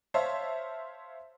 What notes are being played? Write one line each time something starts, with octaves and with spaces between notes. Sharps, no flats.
C5 C#5 E5 F5 A5